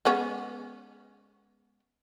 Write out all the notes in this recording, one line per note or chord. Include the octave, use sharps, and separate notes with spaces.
G#3 B3 C#4